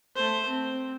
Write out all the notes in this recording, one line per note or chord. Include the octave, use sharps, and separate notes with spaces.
A3 C5
C4